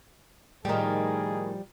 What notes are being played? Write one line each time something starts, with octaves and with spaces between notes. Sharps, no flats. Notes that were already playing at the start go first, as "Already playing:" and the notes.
A2 D#3 F3 G3 G#4 G5 A#5